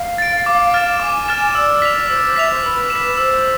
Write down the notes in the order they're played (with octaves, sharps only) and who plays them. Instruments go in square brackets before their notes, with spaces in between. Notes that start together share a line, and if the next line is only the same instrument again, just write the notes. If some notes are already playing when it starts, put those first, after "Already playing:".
Already playing: [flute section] F5
[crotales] A6 D7
D6
F6 A6 E7
[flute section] G#5 [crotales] D6
[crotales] F6 A6 E7
[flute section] D5 [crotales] E6
[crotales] B6 F7
[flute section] C5 [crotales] E6
[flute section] C5
[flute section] E5 [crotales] B6 F7
[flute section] C5
[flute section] B4 [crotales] E6
[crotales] E7
B6
[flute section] C5 [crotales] E6